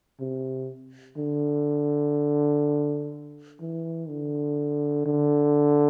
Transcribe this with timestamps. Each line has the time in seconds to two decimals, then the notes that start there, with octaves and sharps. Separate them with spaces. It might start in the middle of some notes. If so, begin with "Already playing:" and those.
0.20 C3
1.17 D3
3.61 E3
4.09 D3
5.06 D3